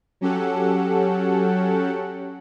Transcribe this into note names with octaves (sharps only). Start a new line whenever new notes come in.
F#3 C#4 G4 A4 F#5